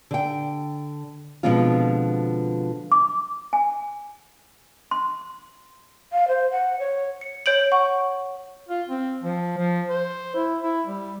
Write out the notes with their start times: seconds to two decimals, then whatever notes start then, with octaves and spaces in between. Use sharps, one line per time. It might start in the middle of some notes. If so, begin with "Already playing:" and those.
0.11 D3 G5
1.43 B2 D3 F3 G#3 C4 F4
2.92 D6
3.53 G#5
4.91 C6
6.12 F5
6.28 C5
6.51 F#5
6.79 C#5
7.21 C#7
7.46 C#5 G6 D7 F#7
7.72 F#5 C#6
8.69 F4
8.88 C4
9.23 F3
9.58 F3
9.90 C5
10.36 E4
10.62 E4
10.87 G3